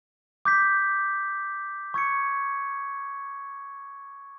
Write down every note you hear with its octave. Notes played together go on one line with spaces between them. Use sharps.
D6 G6 B6
C#6 E6 G#6 C#7